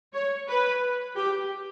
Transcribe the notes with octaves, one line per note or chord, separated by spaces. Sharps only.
C#5
B4
G4